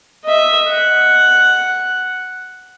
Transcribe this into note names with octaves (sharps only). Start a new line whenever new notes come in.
D#5 E5
F#5